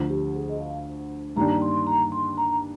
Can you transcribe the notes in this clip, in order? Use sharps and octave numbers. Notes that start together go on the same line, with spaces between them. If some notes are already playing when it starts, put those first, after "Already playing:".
Already playing: D2 D3 F3
G4
G#4
D#5
F5
G2 D#3 G3 A#3 D4 A#5
C6
A#5
C6
A#5